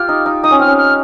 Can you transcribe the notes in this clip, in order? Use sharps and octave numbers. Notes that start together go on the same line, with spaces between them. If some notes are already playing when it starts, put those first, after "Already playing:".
Already playing: F4 G4 F6
D#4
D#4
D#4 D#6
C#4
C4 F6
C#4
F6